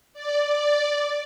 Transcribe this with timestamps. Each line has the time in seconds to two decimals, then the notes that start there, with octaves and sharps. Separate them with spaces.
0.13 D5
0.44 D5